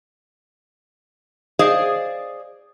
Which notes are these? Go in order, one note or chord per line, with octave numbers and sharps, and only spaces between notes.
G#4 C5 D5 D#5 F5